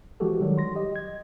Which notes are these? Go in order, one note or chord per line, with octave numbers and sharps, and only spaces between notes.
E3 F3 G#3 F#4 G4 A4
D#3 F#3 G3
C6 A#6
G4 D#5
G#6